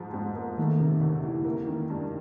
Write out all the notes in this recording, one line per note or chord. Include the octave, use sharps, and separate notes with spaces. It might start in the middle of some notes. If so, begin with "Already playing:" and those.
Already playing: G#2 F3
G#2
A#3
D#3 A3
C3
D2
E3
A#3
D#3
G2